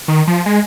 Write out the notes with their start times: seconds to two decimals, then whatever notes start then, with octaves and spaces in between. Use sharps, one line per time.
0.08 D#3
0.28 F3
0.46 G#3